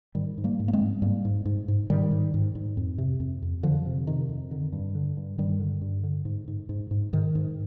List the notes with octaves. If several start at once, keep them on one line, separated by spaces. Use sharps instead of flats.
G#2 D#3 G3
G#2
G3 A#3
G#2
A#3
G#3 C4
G#2
G#2 G3 A#3
G#2
G#2
G#2
G#2 D#3 G3
G#2
G#2
G#2
F2
C3
F2
F2
F2 D3 F3
C3
C3 D#3
F2
D3 D#3
G2
D3
G2
G2 D#3 G3
D3
G2
D3
G#2
G#2
G#2
G#2
G#2 D#3
G#2